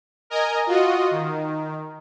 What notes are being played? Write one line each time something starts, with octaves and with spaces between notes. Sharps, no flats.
A#4 D#5 G#5 A#5
F4 F#4 D#5
D#3